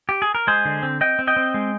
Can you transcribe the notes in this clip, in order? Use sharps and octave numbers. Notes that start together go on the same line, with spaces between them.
G4
G#4
A#4
G#3 G#4 C5
D3
C4
C4 D#5 G5
C4
D#5 G5
C4
G#3